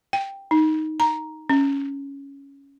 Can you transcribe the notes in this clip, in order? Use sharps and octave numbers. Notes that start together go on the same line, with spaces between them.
G5
D#4
A#5
C#4